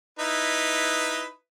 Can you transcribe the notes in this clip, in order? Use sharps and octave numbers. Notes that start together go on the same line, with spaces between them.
D#4 E4 B4